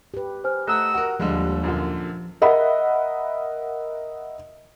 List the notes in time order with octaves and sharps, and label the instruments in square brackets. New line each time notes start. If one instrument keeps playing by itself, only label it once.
[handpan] G4 B4
[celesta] C5 G#5 F6
[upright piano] A3 [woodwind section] D#5 F#5 E6 [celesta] A#5 F#6
[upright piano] F#4 A#4
[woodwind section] D#2 [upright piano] D3 G3 G#3 [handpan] F3
[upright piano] F#2 A#2 D3
[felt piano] A#4 D#5 E5 F#5 B5